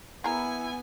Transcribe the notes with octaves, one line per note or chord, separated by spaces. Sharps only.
B3 E4 G#4 A#4 G#5